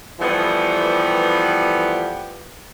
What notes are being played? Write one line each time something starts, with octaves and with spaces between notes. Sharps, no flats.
E3 F3 G3 A3 B3 G4